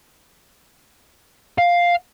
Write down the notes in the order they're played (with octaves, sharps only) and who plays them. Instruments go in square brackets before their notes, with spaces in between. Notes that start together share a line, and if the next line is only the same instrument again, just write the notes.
[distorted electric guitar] F5